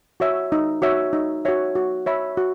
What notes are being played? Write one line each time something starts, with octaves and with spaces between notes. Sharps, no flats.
F#4 C#5 E5
D#4
F#4 C#5 E5
D#4
F#4 C#5 E5
F#4
C#5 E5 B5
F#4